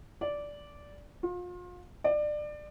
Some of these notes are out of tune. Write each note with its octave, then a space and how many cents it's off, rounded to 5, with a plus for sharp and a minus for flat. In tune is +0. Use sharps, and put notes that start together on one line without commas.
D5 -10
F4 +35
D5 +25